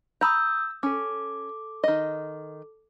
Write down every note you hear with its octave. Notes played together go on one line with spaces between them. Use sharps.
A#5 B5 D#6 E6 G6
C#4 A4 D6
D#3 D#5